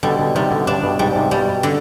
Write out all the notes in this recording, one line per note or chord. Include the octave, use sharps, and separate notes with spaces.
B2 D3 G3
B2 D3
C3 D#3 G3
B2 D3
G2 D4
G2 B2
G#2 C3 G3
G#2 C3
G2 B2 G3
D3